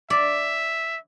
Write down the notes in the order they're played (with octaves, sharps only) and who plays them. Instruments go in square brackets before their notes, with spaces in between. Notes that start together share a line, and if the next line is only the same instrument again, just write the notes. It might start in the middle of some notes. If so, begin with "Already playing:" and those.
[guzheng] D5 [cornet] E5